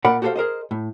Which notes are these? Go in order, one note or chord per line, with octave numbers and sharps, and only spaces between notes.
A#2 A#4 D5 F#5 B5
F#4 G4 A4 B4 C5 F5
G#4 A#4 C5 D#5
A2